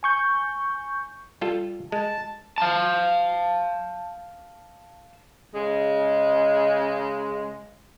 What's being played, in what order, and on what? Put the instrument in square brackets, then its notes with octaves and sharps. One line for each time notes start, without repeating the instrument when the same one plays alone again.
[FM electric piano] G#5 C#6 G6
[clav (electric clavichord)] G3 F4 A4
[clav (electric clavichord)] G#3 [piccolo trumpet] A5
[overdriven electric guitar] F5 A5
[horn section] C#3 G#3